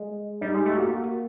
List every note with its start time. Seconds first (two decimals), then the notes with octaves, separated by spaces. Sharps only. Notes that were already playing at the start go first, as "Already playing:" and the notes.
Already playing: G#3
0.41 G3 D#4
0.54 G#3 G4
0.66 A3 G4
0.77 A#3 F#4